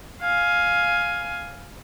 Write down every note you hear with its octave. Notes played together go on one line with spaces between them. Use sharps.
F5 G#5